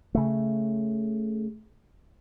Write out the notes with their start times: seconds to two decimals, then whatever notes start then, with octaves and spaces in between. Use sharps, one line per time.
0.15 C#3 A3